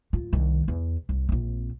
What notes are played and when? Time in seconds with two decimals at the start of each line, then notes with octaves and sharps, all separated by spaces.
0.13 D1 F4
0.33 C2 D#3
0.68 E2
1.09 C2
1.29 A#1 C4